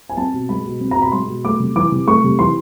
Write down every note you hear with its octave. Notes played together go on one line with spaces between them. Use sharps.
G#5
C4 A5
B2
G#3 B5
B2
C4
A#5
B2
B5
G#3 C6
B2
A3 D6
C3
E3 D6
C3
A3 C#6
C3
E3 C6